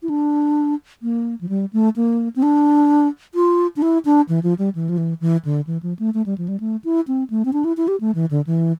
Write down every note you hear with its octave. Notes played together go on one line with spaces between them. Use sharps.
E4
D4
A#3
F3
G3
A3
A#3
C4
D4
F4
D4
E4
D4
E3
F3
G3
E3
F3
E3
E3
D3
E3
F3
A3
A3
G3
F3
G3
A3
E4
C4
A3
C4
D4
E4
E4
G4
A3
E3
D3
E3